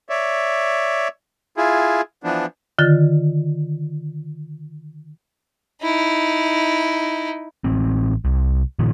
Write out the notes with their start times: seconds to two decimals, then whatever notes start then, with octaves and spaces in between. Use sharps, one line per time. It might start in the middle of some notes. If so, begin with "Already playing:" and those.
0.09 C#5 D5 E5
1.57 E4 F4 G#4
2.24 E3 F3 B3 D4
2.79 D3 D#3 F4 A6
5.82 D#4 E4
7.64 A1 C4
8.25 C2
8.79 A#2 D#3 F3